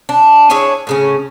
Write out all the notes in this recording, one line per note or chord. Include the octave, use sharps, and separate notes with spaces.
D4
D4 E4 G#4 C#5
A2 C#3 C#4